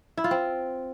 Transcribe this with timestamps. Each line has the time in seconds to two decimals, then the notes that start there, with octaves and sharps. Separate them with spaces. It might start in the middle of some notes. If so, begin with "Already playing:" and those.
0.17 E4
0.24 F4
0.31 C4